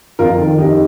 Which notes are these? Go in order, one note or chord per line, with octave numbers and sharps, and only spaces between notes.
F2 F4 A#4
D#3
F2 D#4 G4